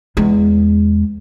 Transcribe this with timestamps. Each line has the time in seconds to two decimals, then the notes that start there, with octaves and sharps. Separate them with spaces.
0.17 E2 G#3